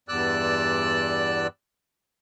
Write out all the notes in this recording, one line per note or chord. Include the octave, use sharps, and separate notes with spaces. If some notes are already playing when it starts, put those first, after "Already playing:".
E2 G2 D5 E6 F#6